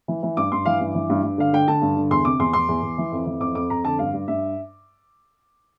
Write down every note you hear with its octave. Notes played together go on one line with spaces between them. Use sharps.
E3
E3
G2 D6
G2 C6
E3 F5
G2
E3
G2
G2
D3 F5
D3 G5
D3 A5
G2
D3
E2 C6
C3 D6
E2 C6
E2 C6
E2
E2
E3
F2
E3
F2 D6
F2 D6
F2 A#5
D3 A5
G2 F5
G2
G2 E5